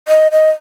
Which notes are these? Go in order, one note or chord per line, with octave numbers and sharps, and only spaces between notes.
D#5
D#5